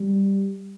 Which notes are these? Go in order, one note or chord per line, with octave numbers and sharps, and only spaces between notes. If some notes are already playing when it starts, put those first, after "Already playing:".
Already playing: G3